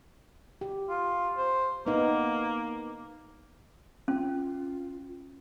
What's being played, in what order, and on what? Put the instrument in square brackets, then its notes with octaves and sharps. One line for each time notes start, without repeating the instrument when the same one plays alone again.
[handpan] G4
[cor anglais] F4
C5
[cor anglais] A#3 [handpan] B3 D#4
[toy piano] C#4 [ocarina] F4